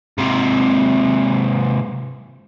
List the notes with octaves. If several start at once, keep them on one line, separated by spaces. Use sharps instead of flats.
G#2 C3